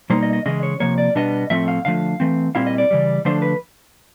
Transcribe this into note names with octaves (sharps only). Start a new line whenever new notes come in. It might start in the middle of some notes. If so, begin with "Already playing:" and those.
B2 G3 A#3 D#4 C5
D#5
D#5
C#3 E3 G#3 C#4 D#5
C#5
C3 F3 A#3 C#5
D5
B2 G3 B3 D4 D#5
A2 F3 A3 C4 E5
F5
D3 F3 A3 F5
E3 A3 C4
A#2 G3 C4 E4 F5
D#5
D5
C#3 E3 G3
D3 F3 A3 D4 C5
B4